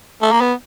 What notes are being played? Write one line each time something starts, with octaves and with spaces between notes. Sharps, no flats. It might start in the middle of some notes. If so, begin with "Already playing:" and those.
A3
A#3
B3